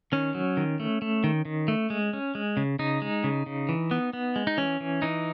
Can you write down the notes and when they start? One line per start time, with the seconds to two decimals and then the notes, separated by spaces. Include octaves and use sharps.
0.12 D#3 C#4
0.35 F#3
0.57 D#3
0.80 A3
1.02 A3
1.24 D#3
1.45 D#3
1.68 A3
1.90 G#3
2.13 C#4
2.35 G#3
2.57 C#3
2.79 C#3 D#4
3.02 G#3
3.24 C#3
3.46 C#3
3.69 E3
3.91 B3
4.13 B3
4.36 G#3
4.47 D#4
4.57 E3 C#4
4.80 E3
5.02 E3 D#4